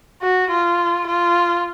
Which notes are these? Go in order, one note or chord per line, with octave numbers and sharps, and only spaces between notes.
F#4
F4
F4